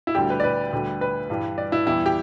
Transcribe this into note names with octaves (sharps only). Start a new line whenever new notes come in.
E4
D2 D3 G3 G4
B4
D5
B4
D2 D3 G3
B4
G2 E3 G3
D5
E4
E2 E3 G3 E4
G4